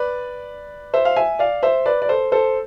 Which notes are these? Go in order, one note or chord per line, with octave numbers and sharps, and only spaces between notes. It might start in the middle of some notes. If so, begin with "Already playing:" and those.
Already playing: B4 D5
C5 E5
F5
E5 G#5
D5 F5
C5 E5
B4 D5
D5
A4 C5
A4 C5